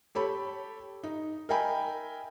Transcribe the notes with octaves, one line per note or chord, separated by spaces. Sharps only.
G4 A4 C#5 B5
D#4
A#4 D#5 E5 G5 G#5 B5